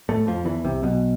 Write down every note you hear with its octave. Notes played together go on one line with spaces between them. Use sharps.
A2 A3
F2 F3
E2 E3
C2 C3
B1 B2